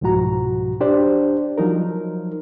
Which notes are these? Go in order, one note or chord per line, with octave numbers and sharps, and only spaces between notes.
C2 G#2 B2 F3 F#4 A#5
D4 G4 C5 D5
F3 F#3 D#4 A#4